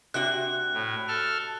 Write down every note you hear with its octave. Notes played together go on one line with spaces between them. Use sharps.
C3 D4 F#4 F#6
A2
A4 F6